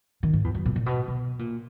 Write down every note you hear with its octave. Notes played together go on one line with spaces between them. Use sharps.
D#3
G#2
E2
F#2
A#2
A#2
B2
B2
A#2